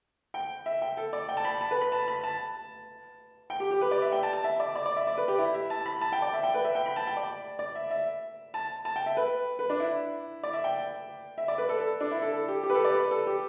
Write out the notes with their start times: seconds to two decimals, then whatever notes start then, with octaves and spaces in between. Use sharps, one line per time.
0.34 G5
0.66 E5
0.82 G5
0.97 A4
1.13 D5
1.29 G5
1.37 A5
1.45 B5
1.61 A5
1.71 B4
1.81 B5
1.92 A5
2.08 B5
2.24 A5
3.50 G5
3.60 G4
3.71 G4
3.81 B4
3.91 D5
4.02 E5
4.12 G5
4.23 A5
4.33 A5
4.44 E5
4.60 D5
4.76 D5
4.86 D5
4.96 E5
5.07 D5
5.17 B4
5.28 G4
5.38 E4
5.54 E5
5.70 A5
5.86 B5
6.01 A5
6.12 G5
6.22 D5
6.34 E5
6.43 G5
6.54 B4
6.65 E5
6.75 G5
6.86 B5
6.96 A5
7.07 G5
7.17 D5
7.59 D5
7.75 E5
7.91 E5
8.54 A5
8.85 A5
8.96 G5
9.06 E5
9.17 B4
9.59 B4
9.70 D4
9.80 E4
10.43 D5
10.53 E5
10.64 G5
11.38 E5
11.48 D5
11.58 B4
11.69 A4
11.80 A4
12.01 D4
12.11 E4
12.22 A4
12.32 A4
12.48 G4
12.63 G4
12.70 B4
12.75 A4
12.85 D5
12.95 B4
13.11 A4
13.27 G4